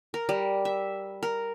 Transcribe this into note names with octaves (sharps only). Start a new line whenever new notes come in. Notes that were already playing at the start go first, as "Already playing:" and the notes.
A#4
G3
E5
A#4